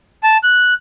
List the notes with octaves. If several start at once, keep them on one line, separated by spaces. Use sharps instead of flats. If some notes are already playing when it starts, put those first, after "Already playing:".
A5
F#6